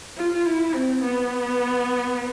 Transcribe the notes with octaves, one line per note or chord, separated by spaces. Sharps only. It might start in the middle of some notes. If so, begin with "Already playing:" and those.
F4
E4
C4
B3